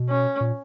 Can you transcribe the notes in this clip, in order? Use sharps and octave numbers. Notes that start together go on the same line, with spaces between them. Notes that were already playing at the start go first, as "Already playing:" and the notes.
Already playing: B2
C#4
A#2